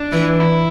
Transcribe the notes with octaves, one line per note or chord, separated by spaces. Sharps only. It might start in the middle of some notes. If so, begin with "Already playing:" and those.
Already playing: D4
E3
E4